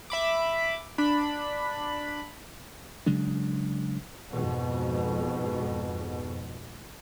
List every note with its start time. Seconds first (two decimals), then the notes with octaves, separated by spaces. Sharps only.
0.10 E5 B5 D6
0.98 D4 B5
3.06 C#3 F#3 G#3 D4
4.30 F2 G#2 B2